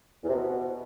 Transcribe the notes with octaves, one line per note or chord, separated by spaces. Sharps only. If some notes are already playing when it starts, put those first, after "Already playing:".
E2
C3
B2